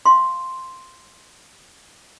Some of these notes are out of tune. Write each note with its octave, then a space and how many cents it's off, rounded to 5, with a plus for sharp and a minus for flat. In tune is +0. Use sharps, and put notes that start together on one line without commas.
F5 +0 C6 +0